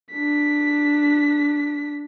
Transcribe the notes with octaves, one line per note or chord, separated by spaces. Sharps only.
D4 B6